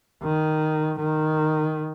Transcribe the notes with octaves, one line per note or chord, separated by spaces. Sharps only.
D#3
D#3